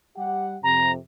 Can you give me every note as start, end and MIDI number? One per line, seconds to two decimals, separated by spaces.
0.17 0.56 55
0.17 0.56 67
0.17 0.56 78
0.63 0.96 41
0.63 0.96 48
0.63 0.92 82